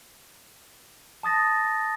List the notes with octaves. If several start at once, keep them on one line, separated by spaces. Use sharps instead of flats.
A5 D#6 A6 A#6